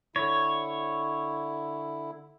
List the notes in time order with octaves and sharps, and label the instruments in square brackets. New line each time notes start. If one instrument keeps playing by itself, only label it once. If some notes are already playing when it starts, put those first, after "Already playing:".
[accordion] D3 E4 [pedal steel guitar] C#5